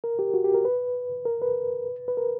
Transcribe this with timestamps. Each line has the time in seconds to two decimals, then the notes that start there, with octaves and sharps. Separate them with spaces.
0.04 A#4
0.19 G4
0.34 F#4
0.44 G4
0.54 A#4
0.65 B4
1.25 A#4
1.42 B4
2.08 B4
2.17 A#4